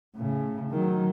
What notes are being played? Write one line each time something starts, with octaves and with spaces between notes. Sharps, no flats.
A2 C#3
D#3 F#3